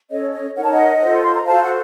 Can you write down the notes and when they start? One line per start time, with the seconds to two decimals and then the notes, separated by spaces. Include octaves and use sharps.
0.10 C#4 A4 C#5 D#5
0.33 D#5
0.55 D#4 A#4 C#5 F#5
0.63 A5
0.72 D#5 F#5
1.01 F4 A4 C5
1.21 C6
1.34 A#5
1.46 F#4 A4 C5 F5 A5
1.63 F#5